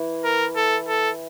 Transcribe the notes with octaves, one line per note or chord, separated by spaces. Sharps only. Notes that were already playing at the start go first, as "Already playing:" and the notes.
Already playing: E3
A#4
A4
A4